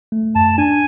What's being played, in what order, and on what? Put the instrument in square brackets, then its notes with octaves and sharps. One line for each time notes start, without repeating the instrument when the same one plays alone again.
[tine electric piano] A3
[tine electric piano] F#2 [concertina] A5
[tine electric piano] D4 [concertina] G#5